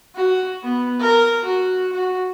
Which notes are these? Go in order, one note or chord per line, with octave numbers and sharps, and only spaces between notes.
F#4
B3
A#4
F#4
F#4